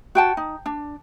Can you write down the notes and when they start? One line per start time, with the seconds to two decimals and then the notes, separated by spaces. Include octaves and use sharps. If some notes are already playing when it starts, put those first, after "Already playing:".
0.15 F#4 G5 A5
0.37 D#4
0.66 D4